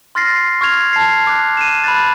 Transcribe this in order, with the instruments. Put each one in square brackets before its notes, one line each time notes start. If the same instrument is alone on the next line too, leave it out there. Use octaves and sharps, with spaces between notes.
[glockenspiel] C6 F6 A6 A#6 C7
C#6 F6 G#6 F7
A5 C7
D6 F#6
D#7 E7
B5 F#6 A6